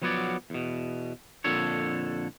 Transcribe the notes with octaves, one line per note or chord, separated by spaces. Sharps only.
F3 F#3 B3 F#4 C#5 D5
E2 B2
F2 A#2 D3 A4 C#5